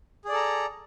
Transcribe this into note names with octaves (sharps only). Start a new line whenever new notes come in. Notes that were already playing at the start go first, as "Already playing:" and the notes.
G#4 A4 D5 A#5